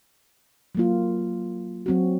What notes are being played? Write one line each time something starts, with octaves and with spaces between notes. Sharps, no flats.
F#3 A#3 F4
F#3 C4 F#4